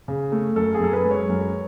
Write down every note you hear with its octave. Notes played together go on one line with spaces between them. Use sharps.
C#3
A3
F#2 A4
G#4
F#2 A4
B4
G#3
C#5
F#2